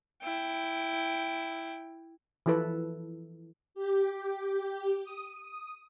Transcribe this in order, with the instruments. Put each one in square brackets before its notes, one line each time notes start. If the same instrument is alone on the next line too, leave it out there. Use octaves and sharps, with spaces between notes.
[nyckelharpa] E4 G5
[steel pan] E3 F3 E4 A4 B4
[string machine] G4
D#6